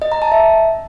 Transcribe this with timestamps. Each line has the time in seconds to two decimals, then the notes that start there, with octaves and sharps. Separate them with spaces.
0.02 D#5
0.12 A#5
0.22 A5
0.32 E5